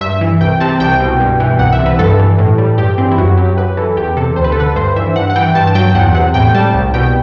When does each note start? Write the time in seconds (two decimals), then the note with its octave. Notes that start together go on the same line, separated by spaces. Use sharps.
0.01 G2 E5
0.21 E3
0.40 C2 G5
0.60 C3 A5
0.80 C2 G5
1.00 B2
1.20 G2
1.40 E3
1.59 C2 F#5
1.73 E5
1.79 C3
1.86 B4
1.99 G2 A4
2.19 E3
2.38 A2
2.58 G3
2.78 G2 G4
2.98 E3 C4
3.11 E4
3.18 F#2 F#4
3.38 F#3 G4
3.57 F#2 B4
3.77 E3 A4
3.97 E2 G4
4.17 C3 A4
4.36 D2 C5
4.44 B4
4.52 A4
4.57 D3 B4
4.76 G2 C5
4.96 E3 E5
5.16 G2 F#5
5.30 F#5
5.36 E3 G5
5.55 G2 A5
5.67 A5
5.75 F#3 G5
5.95 E2 F#5
6.15 C3 F#5
6.34 A2 G5
6.55 G3 A5
6.74 C2
6.94 B2 G5